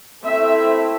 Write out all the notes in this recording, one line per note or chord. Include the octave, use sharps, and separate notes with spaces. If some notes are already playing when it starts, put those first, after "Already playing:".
A3 C4 E4 E5